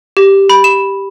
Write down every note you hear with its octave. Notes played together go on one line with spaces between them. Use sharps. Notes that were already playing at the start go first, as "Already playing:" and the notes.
G4
B5
E7